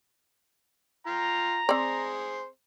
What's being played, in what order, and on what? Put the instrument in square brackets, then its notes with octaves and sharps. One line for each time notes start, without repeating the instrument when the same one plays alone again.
[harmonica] F4 G5 [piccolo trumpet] A#5
[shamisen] C4 D5 [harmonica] G#4 C5